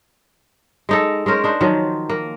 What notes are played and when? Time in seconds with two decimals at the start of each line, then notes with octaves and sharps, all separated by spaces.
0.89 G#3 D#4 A4
1.26 G#3 C#4 A#4 C5
1.44 D4 D#4 C5
1.61 D#3 F3 F#3
2.09 A#3